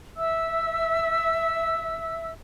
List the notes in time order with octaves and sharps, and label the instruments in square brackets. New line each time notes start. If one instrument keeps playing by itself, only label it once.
[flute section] E5 E6